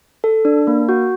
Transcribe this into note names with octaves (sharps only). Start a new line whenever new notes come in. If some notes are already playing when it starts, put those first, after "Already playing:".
A4
D4
A#3
F#4